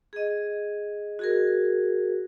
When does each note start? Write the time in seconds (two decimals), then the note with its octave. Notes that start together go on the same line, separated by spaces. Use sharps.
0.13 G#4 D#5
1.19 F#4 G#4 A#4